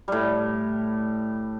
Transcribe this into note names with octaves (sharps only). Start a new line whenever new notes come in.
A2 G3